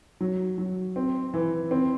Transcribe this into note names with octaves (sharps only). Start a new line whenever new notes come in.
F#3
F#3
C4
E3
C4